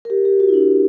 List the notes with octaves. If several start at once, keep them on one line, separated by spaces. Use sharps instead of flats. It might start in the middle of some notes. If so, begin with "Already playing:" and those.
A#4
G4
G4
F#4
E4
D4